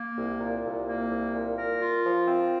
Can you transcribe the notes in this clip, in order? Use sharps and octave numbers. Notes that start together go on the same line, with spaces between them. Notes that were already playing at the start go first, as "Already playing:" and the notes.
Already playing: A#3
C2
A#2
C2
A#3
C2
A#2
A#4
F4
F3
C4